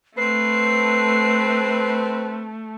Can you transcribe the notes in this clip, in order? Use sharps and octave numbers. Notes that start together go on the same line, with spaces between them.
A3 C4 B4 C7